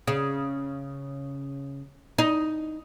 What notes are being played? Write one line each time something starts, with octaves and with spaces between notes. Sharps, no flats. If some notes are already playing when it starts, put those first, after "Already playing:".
C#3
D#4